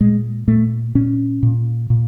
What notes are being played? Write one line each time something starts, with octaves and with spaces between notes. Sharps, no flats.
A#2 G#3
A#2 A3
A#2 C#4
A#2
A#2